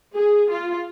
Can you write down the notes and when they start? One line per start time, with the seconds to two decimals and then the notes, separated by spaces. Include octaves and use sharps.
0.15 G#4
0.50 F4